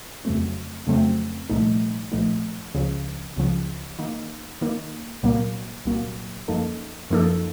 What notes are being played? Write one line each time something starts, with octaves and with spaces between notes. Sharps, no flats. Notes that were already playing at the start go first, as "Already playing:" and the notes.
F2 C#3 F#3 A3 C4
F2 C#3 F#3 A3 C4
C2 A#2 F3 A3 D#4
C2 A#2 F3 A3 D#4
C#2 C#3 F3
C#2 C#3 F3
D#3 A#3 D#4
D#3 A#3 D#4
C2 A#2 F#3 A#3
C2 A#2 F#3 A#3
F#2 F3 A#3 D#4 A4
F#2 F3 A#3 D#4 A4